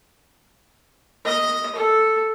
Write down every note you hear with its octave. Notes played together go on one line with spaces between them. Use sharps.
D#5
A4